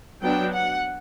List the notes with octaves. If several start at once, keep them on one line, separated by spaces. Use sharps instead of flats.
F#3 B3 D4 G5
F#5